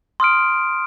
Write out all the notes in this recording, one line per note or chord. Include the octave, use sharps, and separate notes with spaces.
C6 D#6 F6 D7